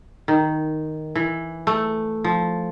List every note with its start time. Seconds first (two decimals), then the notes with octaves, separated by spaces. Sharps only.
0.28 D#3
1.15 E3
1.67 A3
2.24 F3